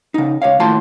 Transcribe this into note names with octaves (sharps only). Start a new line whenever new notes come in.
C#3 D#4
C#2 C#5 F5
D#2 A2 E4 F4 A5 C6